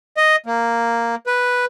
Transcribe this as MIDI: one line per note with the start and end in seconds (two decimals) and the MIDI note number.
0.17 0.36 75
0.46 1.15 58
1.27 1.65 71